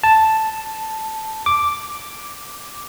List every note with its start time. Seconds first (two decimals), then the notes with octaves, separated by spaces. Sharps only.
0.04 A5
1.46 D6